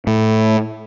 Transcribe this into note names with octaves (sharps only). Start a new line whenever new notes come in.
A2